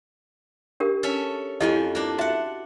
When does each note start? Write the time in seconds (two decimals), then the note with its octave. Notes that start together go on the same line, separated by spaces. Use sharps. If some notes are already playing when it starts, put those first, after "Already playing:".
0.80 D4 G4 A#4
1.03 C#4 A4 E5
1.60 F2 F3 E4 G4 D#5 G#5
1.95 A#3 D4
2.18 F#4 E5 F#5 A5